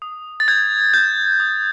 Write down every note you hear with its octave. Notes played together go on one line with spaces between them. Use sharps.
D#6
A6
G6 G#6
G6
D#6